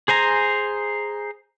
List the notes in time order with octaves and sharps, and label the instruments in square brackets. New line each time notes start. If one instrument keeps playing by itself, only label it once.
[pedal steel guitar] G#4 C5 G#5 A#5